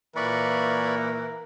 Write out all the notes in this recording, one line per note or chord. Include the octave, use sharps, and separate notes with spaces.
A#2 E3 A#3 A#4 D5 B5 C#6